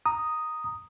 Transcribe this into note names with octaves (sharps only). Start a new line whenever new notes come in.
A#5 D#6